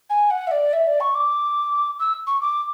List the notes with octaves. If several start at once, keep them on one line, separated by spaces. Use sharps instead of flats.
G#5
F#5
E5
D5
E5
D5
C#6
D6
E6
C#6
D6